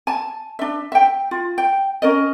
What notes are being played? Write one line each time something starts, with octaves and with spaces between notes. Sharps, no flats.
G#5 A5
D4 E5
E5 G5
F4
G5
C#4 A#4 D#5